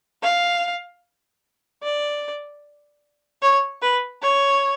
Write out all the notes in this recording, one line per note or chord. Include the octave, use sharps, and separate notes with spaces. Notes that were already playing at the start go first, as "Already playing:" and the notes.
F5
D5
C#5
B4
C#5